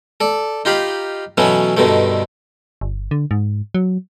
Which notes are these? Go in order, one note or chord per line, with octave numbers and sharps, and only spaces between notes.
A4 D5
D#4 F4 G4 F5 B5
B2 E3 F#3 A3 B3 C#4
G2 B2 D3 D#3 A3
G1
D3
G#2
F#3